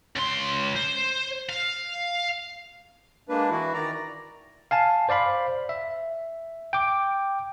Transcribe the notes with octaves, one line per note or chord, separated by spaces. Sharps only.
C#2 C6
C5
F5
G#3 A#3 D4 B4
E3 E4 F#4
D#3 D5 A#5
F5 G#5 A5
C5 D5 F5 B5
E5
G5 D6